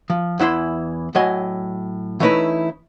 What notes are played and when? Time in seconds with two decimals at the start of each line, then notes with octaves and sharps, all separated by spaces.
0.10 F3
0.39 E2 E3 E4 D#5 C6
1.15 A2 F#3 D#5 G#5 B5
2.20 E3 A3 C#4 D#4 E4 B4